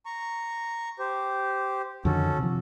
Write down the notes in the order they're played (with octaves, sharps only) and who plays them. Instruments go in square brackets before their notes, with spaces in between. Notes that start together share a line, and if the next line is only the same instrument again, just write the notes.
[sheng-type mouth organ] A#5 C#6
G4 C5
[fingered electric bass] F2 D3 D#3 [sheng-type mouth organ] C#4 F#4 A4
[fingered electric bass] C3 F3